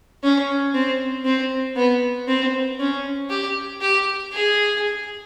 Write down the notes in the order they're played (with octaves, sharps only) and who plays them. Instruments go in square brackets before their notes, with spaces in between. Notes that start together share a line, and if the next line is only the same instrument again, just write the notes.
[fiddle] C#4
C4
C4
B3
C4
C#4
G4
G4
G#4